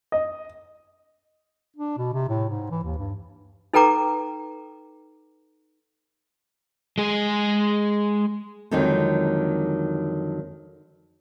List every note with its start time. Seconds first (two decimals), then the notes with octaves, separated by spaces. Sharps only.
0.12 D#5
1.76 D4
1.98 B2
2.14 C3
2.29 A2
2.49 G#2
2.71 E3
2.84 D#2
2.98 G2
3.73 D#4 A4 B4 G5 A#5 D6
6.98 G#3 G#4
8.71 F2 D3 D#3 F#3 G#3 C4